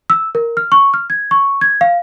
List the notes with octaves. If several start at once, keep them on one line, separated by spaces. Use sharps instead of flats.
E6
A#4
F6
C#6
F6
G#6
C#6
G#6
F5